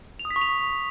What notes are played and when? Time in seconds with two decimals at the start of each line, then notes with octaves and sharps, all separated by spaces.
0.19 F7
0.25 D#6
0.30 B6
0.36 C#6
0.42 F7